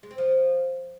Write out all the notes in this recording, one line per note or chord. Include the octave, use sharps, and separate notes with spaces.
G#3
C4
F3